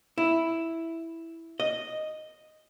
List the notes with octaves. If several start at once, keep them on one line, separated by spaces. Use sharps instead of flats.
E4
D#5